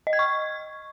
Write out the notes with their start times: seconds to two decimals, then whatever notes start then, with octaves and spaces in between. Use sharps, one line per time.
0.07 D#5
0.13 G#6
0.19 C#6